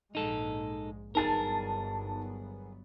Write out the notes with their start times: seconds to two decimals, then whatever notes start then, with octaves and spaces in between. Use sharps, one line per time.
0.15 A#1 G#2 G#3 D#4 A4
1.15 G1 F#3 B3 D#4 G#4 A#4 A5 A6